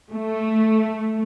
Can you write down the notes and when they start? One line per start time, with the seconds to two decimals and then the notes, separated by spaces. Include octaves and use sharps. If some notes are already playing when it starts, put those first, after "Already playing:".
0.12 A3